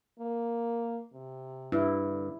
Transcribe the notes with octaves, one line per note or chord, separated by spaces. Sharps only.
A#3
C3
G2 E4
D3